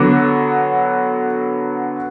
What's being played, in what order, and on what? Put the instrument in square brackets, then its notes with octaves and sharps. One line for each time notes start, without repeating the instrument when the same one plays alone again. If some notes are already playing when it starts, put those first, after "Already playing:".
Already playing: [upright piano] D3 F#3 B3 D6